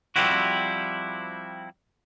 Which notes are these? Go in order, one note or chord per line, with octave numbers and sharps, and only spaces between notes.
F3 G3 C4 E4 F#4